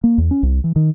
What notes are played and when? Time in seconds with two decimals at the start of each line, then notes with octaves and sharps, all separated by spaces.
0.04 A#3
0.18 E2
0.31 C#4
0.43 C2
0.64 E3
0.76 D#3